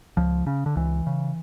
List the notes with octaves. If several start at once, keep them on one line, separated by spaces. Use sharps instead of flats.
C#2 F3
C#3
D3
C#2 E3
C#3